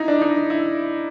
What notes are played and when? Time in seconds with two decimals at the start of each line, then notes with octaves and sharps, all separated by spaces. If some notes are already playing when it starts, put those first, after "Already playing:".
Already playing: D#4 E4
0.08 D4
0.22 D#4
0.50 E4